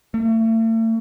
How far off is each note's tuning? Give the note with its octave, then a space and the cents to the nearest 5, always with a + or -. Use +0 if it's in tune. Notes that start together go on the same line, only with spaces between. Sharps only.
A3 +40